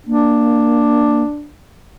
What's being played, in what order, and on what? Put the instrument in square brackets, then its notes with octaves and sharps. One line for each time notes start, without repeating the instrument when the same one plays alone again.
[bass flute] A#3 [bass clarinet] D4